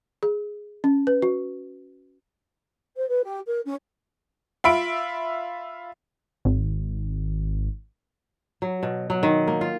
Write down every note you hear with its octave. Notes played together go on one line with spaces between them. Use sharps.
G#4
C#4
B4
F#4
C5
B4
G4
A#4
C#4
F4 E5 B5 D7
G#1
F#3
B2
F#3
D#3
A#3
F4